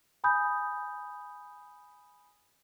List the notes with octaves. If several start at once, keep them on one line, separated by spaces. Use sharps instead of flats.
G#5 B5 D#6 G6